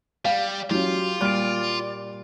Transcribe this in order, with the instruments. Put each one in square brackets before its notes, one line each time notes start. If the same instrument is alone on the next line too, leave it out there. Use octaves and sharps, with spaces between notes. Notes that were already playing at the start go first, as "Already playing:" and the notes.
[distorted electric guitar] G3 [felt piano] F5
[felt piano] F#3 C#4 [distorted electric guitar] F4 [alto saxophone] G4
[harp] A#2 G3 [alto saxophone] D5 [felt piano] F6 D7